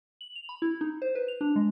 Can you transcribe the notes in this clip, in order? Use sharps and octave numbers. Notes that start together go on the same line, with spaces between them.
F#7
F7
B5
E4
D#4
C5
B4
F7
D4
G#3